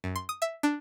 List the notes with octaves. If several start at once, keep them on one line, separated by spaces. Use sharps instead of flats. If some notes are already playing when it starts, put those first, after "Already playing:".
F#2
C6
D#6
E5
D4